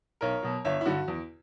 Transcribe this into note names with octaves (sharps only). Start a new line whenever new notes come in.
B1 A#4 C#5
B2 F#3
G1 C#5 E5
E4
G2 D3 F#4
E2